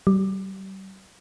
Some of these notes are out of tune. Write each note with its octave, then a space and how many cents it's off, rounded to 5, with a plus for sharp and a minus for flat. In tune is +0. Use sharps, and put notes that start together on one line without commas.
G3 -35